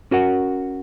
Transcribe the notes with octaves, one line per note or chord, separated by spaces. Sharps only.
C#4 F#4 A#4 F#5